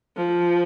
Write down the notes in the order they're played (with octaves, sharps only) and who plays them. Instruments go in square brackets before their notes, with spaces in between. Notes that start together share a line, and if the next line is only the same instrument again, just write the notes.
[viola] F3